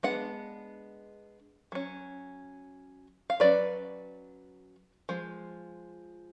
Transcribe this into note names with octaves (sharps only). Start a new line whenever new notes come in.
G#3 B3 D4 F#5
F#3 C#4
F5
F#3 C#4 B4 D5
F3 G#3